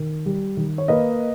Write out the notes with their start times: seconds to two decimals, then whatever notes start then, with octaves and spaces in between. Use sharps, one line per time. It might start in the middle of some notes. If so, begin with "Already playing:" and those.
Already playing: D#3 A#4
0.26 G3
0.57 D#3
0.78 C#5
0.88 A#3 B4 D#5